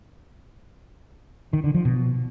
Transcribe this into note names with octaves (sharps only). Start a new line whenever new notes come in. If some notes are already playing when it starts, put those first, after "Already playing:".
D#3
D3
F3
B2